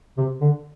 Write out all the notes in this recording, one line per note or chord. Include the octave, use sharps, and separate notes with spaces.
C3
D3